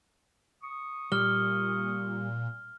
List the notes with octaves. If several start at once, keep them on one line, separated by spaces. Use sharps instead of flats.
C#6 D#6
A#2 G3 F6 G7